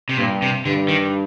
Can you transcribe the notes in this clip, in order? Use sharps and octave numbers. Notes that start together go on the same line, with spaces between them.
C3
G2 A#2
C3
G2 D3
D#3